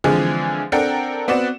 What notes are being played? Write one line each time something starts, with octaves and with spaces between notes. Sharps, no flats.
D3 E3 F3 G#3 C4 G#4
C4 D4 A4 A#4 F#5 G5
B3 C4 F#4 D5 F#5 E7